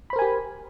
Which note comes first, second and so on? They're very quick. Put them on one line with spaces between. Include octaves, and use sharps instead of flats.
B5 C5 A#4 G#5 G4